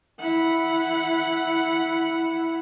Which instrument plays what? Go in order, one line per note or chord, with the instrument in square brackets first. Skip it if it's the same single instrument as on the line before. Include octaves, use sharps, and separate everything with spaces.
[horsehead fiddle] E4 F#5